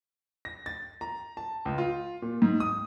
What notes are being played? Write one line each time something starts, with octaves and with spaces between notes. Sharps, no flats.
A#6
A6
A#5
A5
C#2
F4
A#2
G#2
D#6